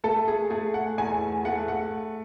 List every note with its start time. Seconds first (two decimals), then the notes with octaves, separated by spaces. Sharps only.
0.04 A3 A4
0.28 G#4
0.50 A3 G#4
0.74 F#5
0.98 E2 G#5
1.45 A3 F#5
1.68 F#5